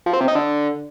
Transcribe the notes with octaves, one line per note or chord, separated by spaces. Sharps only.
F3
C4
C3
D#4
D3